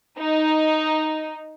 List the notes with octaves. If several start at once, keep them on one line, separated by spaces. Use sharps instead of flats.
D#4